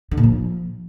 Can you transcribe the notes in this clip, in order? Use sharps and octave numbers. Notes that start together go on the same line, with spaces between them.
D3
A#2
F3